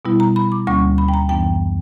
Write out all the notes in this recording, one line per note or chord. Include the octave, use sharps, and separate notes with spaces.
B2 G3 B3 E4
A#5
B5
D6
D2 D3 G3 A#3 C#4 C#6
B5
G5
A#5
F#2 E3 B3 D4 G5